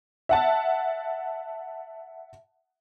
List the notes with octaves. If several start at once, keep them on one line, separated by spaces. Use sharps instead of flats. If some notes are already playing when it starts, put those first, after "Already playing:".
E5 F#5 A5